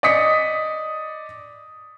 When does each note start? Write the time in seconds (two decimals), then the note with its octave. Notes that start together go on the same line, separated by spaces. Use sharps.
0.03 D5 D#5 D#6 B6 C#7